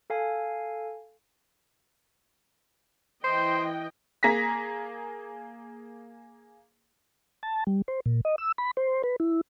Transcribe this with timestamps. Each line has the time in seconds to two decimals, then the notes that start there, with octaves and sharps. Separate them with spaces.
0.10 A4 F5 G#5
3.24 E3 C5 D#5 G5
4.23 A#3 G#4 A#5 A#6 B6
7.43 A5
7.67 G3
7.88 C5
8.06 A#2
8.25 D#5
8.38 E6
8.58 B5
8.77 C5
9.03 B4
9.20 E4